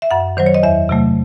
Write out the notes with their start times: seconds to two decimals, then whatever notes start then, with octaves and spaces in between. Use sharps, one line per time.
0.02 E5
0.11 F#2 F#5
0.37 D#3 F#3 C5
0.46 C#5
0.54 D#5
0.63 E2 E5
0.89 C3 F#3 A3